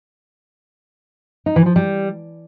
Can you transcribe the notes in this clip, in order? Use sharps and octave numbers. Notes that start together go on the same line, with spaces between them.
D#4
E3
F3
G3